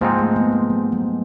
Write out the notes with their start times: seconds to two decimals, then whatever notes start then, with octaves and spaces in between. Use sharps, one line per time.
0.01 G#2 F3 G#3 A#3 C4 D#4
0.19 A3
0.36 B3
0.52 G3
0.70 F#3
0.92 F#3